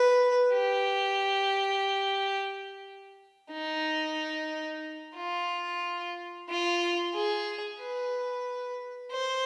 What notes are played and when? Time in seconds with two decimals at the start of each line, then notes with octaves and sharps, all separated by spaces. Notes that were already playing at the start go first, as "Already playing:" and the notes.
Already playing: B4
0.54 G4
3.52 D#4
5.16 F4
6.49 F4
7.15 G#4
7.80 B4
9.12 C5